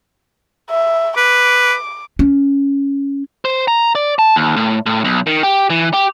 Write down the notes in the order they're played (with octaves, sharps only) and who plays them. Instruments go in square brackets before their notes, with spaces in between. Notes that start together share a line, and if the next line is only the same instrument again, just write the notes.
[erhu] E5
[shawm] B4 [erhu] D6
[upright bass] C#4
[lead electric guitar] C5
A#5
D5
A5
D#2
A2
A2
B1
D#3
G4
E3
G4